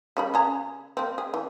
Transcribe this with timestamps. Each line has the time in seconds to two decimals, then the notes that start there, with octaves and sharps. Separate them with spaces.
0.17 C#3 G3 B5
0.34 C#3 G#4 A#5
0.97 A#3 C4
1.18 G#4
1.34 E3